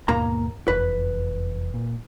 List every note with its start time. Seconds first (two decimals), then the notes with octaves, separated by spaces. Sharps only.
0.08 D#2 G#2 B2 A#3 A#5
0.68 F1 E2 B4
1.74 A#2